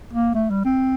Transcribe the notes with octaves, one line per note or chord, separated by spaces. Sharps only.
A#3
A3
G3
C4